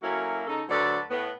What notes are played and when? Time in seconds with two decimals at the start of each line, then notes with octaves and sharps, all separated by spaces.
0.02 F#3 A3 A#3 C#4 E4 F#4
0.47 C#3 D#4 A4
0.69 D2 F#3 A4 B4 C5 D5
1.10 A2 B3